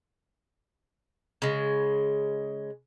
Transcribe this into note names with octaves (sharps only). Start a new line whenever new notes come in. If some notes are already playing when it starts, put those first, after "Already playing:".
C#3 G#3